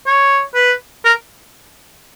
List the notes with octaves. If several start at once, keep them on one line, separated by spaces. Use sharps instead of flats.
C#5
B4
A#4